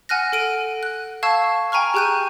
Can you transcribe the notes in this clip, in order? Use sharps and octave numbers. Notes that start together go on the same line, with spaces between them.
F#5 G#5 F6 F#6 A#6
A4 D7 D#7
F#6
F5 A5 C#6 E6 G#6 E7
G5 G#5 A#5 C#6 F6
G4 G#4 G5 F#6 G6 D#7